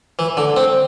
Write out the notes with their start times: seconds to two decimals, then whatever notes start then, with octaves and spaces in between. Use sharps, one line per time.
0.19 E3
0.37 D3
0.57 C4